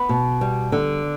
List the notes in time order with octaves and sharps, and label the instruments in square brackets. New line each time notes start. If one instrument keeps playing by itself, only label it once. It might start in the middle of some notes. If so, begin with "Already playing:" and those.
Already playing: [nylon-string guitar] B3 B4
B2
G3
D3